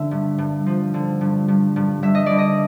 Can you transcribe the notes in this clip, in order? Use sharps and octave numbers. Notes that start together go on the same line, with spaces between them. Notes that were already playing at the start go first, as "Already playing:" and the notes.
Already playing: D3 E5
G2
G2
F3
D3
G2
G2
G2
G2 E5
D#5
D3 D5
D#5